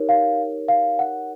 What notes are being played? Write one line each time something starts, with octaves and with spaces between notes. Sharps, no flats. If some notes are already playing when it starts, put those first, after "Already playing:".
Already playing: D#4 G4 A#4 C#5
F5
F5
F#5